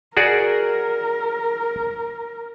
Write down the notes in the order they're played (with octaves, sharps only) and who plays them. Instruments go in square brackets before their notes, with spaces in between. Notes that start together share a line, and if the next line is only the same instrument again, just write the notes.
[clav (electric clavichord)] F#4 G#4 D5 [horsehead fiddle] A#4